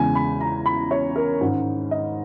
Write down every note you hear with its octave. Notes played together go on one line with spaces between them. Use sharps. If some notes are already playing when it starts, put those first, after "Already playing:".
Already playing: E2 C#3 G#3 C#4 G#5
B5
A#5
B5
C#5
A#4
G#2 D#3 G#3 C#4
D#5